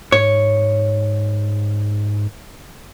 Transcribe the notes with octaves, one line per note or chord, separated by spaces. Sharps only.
G#2 C#5